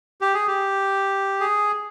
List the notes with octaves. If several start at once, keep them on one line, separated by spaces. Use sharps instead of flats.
G4
G#4
G4
G#4